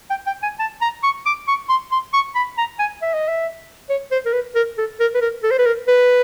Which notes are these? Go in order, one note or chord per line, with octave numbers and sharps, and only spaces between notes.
G5
G5
G#5
A5
A#5
C#6
D6
C#6
C6
C6
C#6
B5
A#5
G#5
E5
D#5
E5
C#5
C5
A#4
B4
A#4
A4
A#4
B4
A#4
A4
C5
B4
A#4
B4